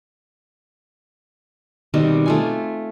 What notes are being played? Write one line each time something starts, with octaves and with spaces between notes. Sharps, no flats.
B2 D#3 G3 C4
A3 F4 G#5